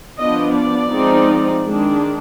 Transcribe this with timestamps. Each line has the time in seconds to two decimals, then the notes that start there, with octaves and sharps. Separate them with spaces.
0.19 F3 B3 D4 D#5
0.55 D5
0.91 F3 G#3 C4 D#4
1.64 D#3 G#3 D4